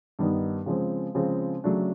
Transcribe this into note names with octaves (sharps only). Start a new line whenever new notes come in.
G2 D#3 G3 B3 D#4
C#3 F3 G#3 C4
C#3 F3 G#3 C4
C#3 F#3 A3 D4